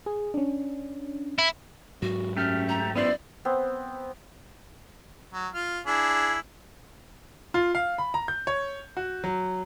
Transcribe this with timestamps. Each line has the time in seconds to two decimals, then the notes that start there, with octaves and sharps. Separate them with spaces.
0.06 G#4
0.34 C#4 D4
1.38 E4
2.02 G#2 F#3 F#4
2.37 F#2 A3 G4 F6
2.69 A#5
2.95 F#2 B3 E4 C5 D5
3.45 B3 C4
5.33 F#3
5.54 F4 F6
5.86 D4 E4 G#4
7.54 F4
7.75 F5
7.98 B5
8.14 A#5
8.28 G6
8.47 C#5
8.97 F#4
9.24 F#3